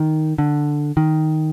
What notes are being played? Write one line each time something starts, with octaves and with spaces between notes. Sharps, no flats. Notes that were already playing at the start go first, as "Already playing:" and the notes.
Already playing: D#3
D3
D#3